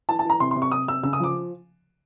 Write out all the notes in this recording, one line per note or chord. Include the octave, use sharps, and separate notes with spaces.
E3 A5
A5
E3 A#5
C3 C6
C6
C3
C#6
C3 D#6
C3 E6
C#3 E6
D#6
F3 D6